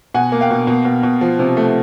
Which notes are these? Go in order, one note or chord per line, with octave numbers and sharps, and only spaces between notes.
B2 F#5 G#5
A#3
F5 G5
B2
B2
B2
B2
F3
C3
A3